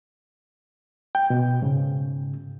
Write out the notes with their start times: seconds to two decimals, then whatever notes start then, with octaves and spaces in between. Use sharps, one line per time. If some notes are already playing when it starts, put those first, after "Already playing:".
1.15 G5
1.30 B2
1.62 G#2 C#3